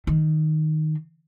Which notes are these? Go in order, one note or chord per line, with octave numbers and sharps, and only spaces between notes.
D#3